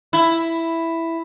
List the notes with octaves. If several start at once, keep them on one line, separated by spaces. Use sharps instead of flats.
E4